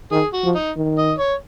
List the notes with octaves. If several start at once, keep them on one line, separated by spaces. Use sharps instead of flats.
D#3 G#4
F#4
F3
D#4
D#3
D#5
C#5